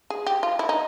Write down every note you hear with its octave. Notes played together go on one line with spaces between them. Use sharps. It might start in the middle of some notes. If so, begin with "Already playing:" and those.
G#4
G4
F4
E4
D#4